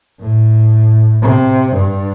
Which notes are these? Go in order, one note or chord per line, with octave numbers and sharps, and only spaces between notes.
A2
C3
G2